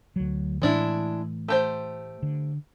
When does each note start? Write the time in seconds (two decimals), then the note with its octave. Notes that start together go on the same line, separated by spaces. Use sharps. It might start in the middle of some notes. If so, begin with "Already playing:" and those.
0.16 D2 F#3
0.62 A2 E3 G#3 D4 E4
1.48 A3 G4 C5
2.22 D3